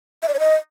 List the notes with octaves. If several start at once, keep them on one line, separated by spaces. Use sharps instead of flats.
E5
D5
C#5
D#5